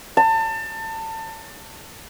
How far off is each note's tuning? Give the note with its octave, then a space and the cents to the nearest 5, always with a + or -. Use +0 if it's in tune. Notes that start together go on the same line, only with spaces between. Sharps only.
A5 +30